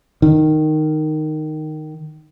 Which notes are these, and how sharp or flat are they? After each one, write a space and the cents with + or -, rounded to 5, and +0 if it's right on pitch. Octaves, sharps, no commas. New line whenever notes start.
D#3 -10